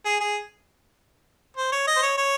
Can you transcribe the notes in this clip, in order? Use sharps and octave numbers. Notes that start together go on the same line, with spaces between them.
G#4
G#4
C5
C#5
D#5
C5
C#5
C#5